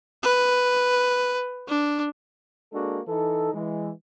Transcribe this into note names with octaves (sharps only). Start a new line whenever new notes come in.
B4
D4
G#3 A#3 D4 F#4 A4
E3 D#4 A4
E3 G#3